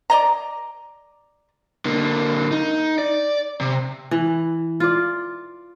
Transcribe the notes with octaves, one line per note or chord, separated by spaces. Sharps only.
D5 D#5 A#5
D3 A#3
D#4
D5
C3
E3
F4 D5